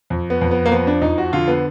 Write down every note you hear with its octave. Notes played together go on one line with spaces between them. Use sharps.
F2
B3
F2
B3
A#3
F3 B3
D4
F2 D#4
F#4
D3 F4
B3